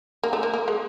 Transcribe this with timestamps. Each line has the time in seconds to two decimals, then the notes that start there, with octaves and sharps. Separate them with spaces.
0.23 A#3
0.33 A3
0.43 A#3
0.54 A#3
0.68 G#3